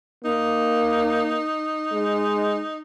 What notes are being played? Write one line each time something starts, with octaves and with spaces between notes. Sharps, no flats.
A#3 D#4
G#3